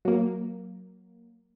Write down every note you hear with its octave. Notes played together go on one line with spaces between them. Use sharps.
F#3 A#3